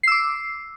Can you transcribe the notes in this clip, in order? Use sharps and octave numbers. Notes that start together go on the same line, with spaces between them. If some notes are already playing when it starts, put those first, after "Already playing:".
D6 E6 C7